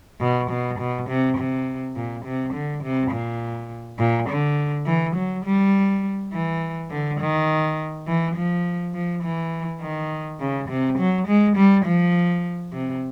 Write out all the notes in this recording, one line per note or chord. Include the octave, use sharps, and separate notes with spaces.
B2
B2
B2
C3
C3
A#2
C3
D3
C3
A#2
A#2
D3
E3
F#3
G3
E3
D3
D#3
E3
F3
F3
E3
D#3
C#3
C3
F#3
G#3
G3
F3
C3